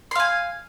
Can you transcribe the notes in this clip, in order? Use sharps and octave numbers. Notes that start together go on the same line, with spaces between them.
F5 G#5 C6